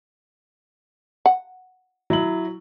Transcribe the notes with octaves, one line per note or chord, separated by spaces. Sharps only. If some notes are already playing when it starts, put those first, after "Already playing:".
F#5
F#3 E4 F#7